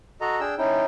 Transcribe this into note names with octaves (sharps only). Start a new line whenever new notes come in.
F#4 A4 D#5 A#5
D4 G#4 G5 E6
C#4 D#4 E4 G5